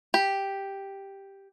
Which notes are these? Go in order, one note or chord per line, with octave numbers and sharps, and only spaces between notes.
G4